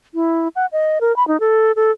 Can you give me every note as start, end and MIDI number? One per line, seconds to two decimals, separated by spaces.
0.15 0.48 64
0.56 0.66 78
0.72 0.98 75
1.01 1.15 70
1.16 1.26 83
1.28 1.40 63
1.40 1.72 69
1.76 1.91 69